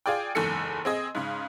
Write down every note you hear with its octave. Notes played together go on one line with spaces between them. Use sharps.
F4 G#4 D5 G5
F#1 E2 G#2 A4 C#7
C4 G#4 D#5
G#2 C#3